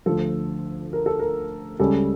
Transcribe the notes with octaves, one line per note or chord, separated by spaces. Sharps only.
D2 D3 F3 A4
A#4
A4
A#4
C#2 C#3 G3 C#4 A4